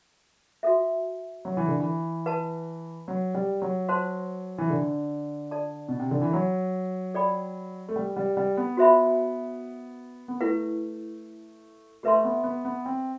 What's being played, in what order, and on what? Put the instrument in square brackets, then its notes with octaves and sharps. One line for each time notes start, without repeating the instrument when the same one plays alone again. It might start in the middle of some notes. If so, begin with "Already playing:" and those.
[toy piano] F#4 A4 E5
[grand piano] F#3
E3
D3
E3
[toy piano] B4 F#5 A5
[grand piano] F#3
G3
F#3
[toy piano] C5 F#5 A5 C6
[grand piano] E3
D3
[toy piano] A4 D5 A5
[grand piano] B2
C3
D3
E3
F#3
[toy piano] A4 D5 G5 B5
[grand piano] A3
G3
G3
G3
B3
[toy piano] F#4 C5 E5 B5
[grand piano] B3
[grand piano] A3 [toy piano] E4 B4 F#5
[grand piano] A3 [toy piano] G4 B4 E5 A5 C6
[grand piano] B3
B3
B3
C4